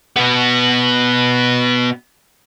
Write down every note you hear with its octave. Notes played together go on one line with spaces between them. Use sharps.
B2 B3